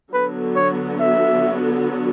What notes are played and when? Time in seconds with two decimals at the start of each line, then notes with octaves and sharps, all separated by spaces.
0.13 D3 F#3 B3 F#4 B4
0.55 C#5
1.00 E5